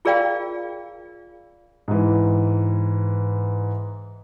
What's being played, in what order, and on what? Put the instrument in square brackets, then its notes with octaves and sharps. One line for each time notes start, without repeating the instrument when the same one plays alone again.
[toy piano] F4 G#4 A#4 D5 F5 G5
[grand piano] G#2 E3